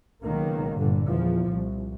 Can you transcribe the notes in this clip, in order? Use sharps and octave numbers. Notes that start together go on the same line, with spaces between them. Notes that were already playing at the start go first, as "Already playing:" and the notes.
C#2 B2 D#3 F#3 A#3
G1 A#2 D3 G3
E2 A#2 F3
C2